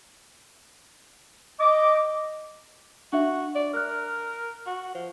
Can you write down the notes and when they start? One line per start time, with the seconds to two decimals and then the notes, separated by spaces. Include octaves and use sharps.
1.59 D#5 D6
3.13 D4 F#4 E5
3.55 D5
3.73 A#4 F6 F#6
4.66 F#4
4.94 F3